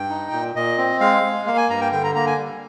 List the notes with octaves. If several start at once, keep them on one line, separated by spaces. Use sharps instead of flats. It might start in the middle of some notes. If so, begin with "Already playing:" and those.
Already playing: G2 G5
D#4
A#2
A#2 D#5
C4
G#3 F5
G#3
A#3 F5
G#5
G2 A#5
G5
D3 G5
A#5
A#3 A#5
G#5
G3